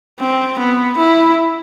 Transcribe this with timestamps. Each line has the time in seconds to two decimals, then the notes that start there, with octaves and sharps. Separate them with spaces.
0.20 C4
0.58 B3
0.97 E4